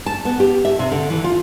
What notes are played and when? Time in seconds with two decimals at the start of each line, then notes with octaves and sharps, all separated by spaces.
0.06 A5
0.25 B3
0.40 G4
0.65 E5
0.79 C3
0.92 D3
1.10 E3
1.24 F4